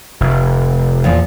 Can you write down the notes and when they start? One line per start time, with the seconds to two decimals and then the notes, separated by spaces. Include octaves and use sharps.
0.20 F1
1.04 E2 A#2 F3